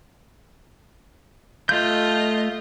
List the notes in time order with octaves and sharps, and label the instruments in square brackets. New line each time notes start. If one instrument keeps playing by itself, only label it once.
[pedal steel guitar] A3 G6 [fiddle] F4 D#5